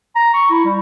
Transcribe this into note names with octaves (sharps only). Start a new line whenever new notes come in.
A#5
C#6
E4
G3